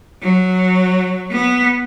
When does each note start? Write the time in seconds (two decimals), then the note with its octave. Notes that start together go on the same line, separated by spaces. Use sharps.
0.22 F#3
1.32 B3